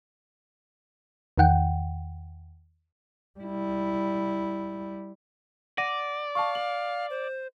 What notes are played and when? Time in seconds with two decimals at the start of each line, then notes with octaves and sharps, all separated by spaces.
1.38 E2 D#3 F#5 G5
3.39 G3 E4
5.78 D5 F#5 A#6 D#7
6.35 F5 A5 C#6
6.55 F#7
7.10 C5